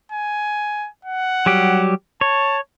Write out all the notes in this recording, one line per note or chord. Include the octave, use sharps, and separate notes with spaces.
G#5
F#5
F#3 G3 G4
C#5 A5